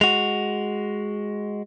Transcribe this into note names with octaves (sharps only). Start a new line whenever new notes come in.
G#3 F#4 F7